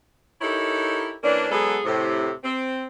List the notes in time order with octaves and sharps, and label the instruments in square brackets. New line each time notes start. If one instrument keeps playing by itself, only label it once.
[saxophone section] D#4 E4 G4 A4 A#4 C#5
E3 A#3 C#4 D4
F#3 G#3 B3 G#4 A4 B4
A2 C3
C4